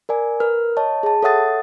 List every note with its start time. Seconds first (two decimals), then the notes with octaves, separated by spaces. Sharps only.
0.09 A#4 D5 G#5
0.40 A#4 B4 F6
0.77 C#5 D#5 A5
1.03 G#4 A5
1.22 A4 C#5 E5 F#5 D#6 A6